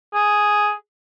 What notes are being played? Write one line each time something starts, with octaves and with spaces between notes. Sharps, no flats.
G#4